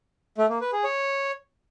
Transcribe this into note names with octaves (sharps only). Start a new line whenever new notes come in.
A3
A#3
B4
G#4
C#5